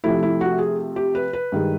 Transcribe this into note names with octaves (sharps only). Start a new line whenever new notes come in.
C3 F3 A3 E4
E4
F#4
G#4
G4
B4
B4
G2 D#3 G#3